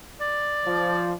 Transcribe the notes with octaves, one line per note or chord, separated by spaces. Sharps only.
D5
F3